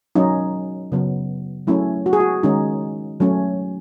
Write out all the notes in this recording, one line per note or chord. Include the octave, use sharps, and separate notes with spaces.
F#3 C#4 D#4
C#3 F#3 B3
F#3 A3 C#4 E4
F#4
G#4
F#4
D#3 G#3 C#4 D#4
F#3 A3 C#4